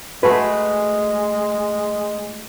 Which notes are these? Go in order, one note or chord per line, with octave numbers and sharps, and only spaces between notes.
G#3 A3 F#4 G#4 B4